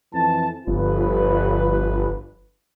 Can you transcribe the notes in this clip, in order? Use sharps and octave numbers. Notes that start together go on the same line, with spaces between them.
F2 E3 A5
G1 F3 F4 B4